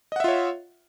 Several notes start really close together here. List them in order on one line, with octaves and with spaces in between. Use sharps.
D#5 F#5 E5 F4 C#5